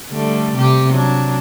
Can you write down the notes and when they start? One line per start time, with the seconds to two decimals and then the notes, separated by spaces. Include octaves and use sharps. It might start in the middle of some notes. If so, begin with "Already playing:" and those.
0.10 D3 G3 A3
0.55 C3 G4
0.91 F#3 D4